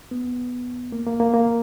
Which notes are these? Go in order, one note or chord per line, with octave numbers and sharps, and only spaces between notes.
B3
A#3
A#3
A#3
A#3